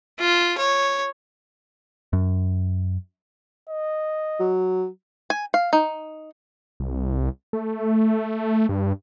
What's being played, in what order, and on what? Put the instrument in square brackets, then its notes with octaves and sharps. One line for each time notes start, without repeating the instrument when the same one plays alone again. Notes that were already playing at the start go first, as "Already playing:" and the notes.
[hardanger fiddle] F4
C#5
[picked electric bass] F#2
[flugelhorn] D#5
[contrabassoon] F#3
[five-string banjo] G#5
F5
D#4
[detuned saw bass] C2
A3
G2